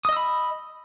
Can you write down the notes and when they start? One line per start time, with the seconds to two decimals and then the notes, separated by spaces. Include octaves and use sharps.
0.05 D#6
0.09 D#5
0.13 E6
0.17 B5